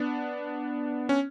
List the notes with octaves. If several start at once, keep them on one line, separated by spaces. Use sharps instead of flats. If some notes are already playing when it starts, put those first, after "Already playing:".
Already playing: B3 D4
C#4